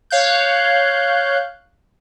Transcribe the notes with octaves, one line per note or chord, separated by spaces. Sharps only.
C#5 F5 F#6 G6